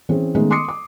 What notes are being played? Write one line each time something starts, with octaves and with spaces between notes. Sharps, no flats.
E3 C4 C#4 G#4
D#3 G#3 A3 B3 C#4
C6 D6 D#6 C7 C#7
D6